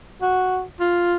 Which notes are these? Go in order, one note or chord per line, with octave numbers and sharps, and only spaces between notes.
F#4
F4